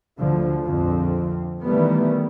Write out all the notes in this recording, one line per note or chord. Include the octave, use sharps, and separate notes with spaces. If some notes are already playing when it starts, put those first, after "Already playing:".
D2 D3 F3
A#1 F2 D3 C4
D#3 E3 G3 A3 B3